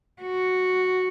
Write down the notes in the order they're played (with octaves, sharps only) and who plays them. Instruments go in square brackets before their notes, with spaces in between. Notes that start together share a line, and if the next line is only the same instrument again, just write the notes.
[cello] F#4